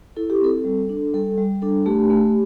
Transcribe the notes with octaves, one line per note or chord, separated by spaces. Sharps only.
E4 A4
G4
C4 A4
G3
D4
G3 A4
G3
D4 A4
A3 G4
A3